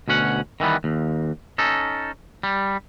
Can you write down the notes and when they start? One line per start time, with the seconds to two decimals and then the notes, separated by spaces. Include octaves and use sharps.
0.08 D2 B2 C#4 F#5
0.60 D#3 E3 G3 B3
0.84 D#2
1.58 C#4 D#4 A4
2.43 G3